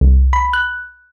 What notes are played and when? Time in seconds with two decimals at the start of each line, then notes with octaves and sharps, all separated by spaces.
0.01 C2
0.33 B5
0.53 F#6